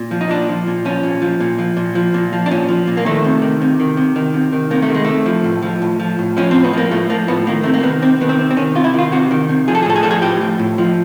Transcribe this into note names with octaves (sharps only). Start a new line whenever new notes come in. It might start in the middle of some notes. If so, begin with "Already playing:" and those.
Already playing: A#2
F3
D#4
A#2 D4
F3
A#2
F3 C#4
A#2
F3
A#2
F3
A#2
F3
A#2
F3
D4
A#2 C#4
F3
A#2
A#3
D#3 A3
C3
D#3
C3
D#3
C3
D#3
C3
D#3
C3 A#3
A3
D#3
G#3
C3 A3
F3
A2
F3
A2
F3
A2
F3 C#4
A2 C4
B3
F3 A#3
A2 A3
F3 A#3
A2 B3
D#3 A#3
C3 A3
A#3
D#3 B3
C3 C4
D#3 B3
C4
C3
C4
D#3 C#4
C3 F4
E4
D#3 F4
C3 F#4
D#3
C3
F3 G#4
A4
G#4
A2 A4
G#4
F3 A4
G#4
A2 G4
F3
A2
F3